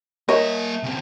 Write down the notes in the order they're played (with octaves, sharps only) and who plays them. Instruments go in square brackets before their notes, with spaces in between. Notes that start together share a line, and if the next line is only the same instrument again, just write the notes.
[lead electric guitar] A#3 E5 [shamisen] A#4 C#5 [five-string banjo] D#5
[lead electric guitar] C#3 C4